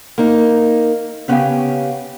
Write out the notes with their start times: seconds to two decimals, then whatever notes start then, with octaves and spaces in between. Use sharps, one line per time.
0.18 A#3 D#4
1.28 C#3 B3 C#4 G4 F5 G5